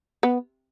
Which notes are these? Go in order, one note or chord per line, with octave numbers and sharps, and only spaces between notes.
B3